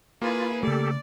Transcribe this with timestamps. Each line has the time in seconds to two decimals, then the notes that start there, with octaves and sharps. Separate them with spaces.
0.22 A#3 E4 F4 G#4 B4
0.63 C#3 A3 G4 A4 D5